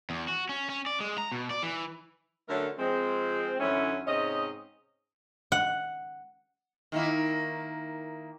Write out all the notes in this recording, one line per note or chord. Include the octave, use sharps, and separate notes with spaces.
E2
F#4
C#4
C#4
D5
G#3
A#5
B2
D5
E3
D3 F#3 A3 C#4 A4 A#4
F3 G#3 C4
F#2 D3 E3 F#3 C#4 E4
G#2 C3 C#4 D#5
F#5
D#3 A#3 E4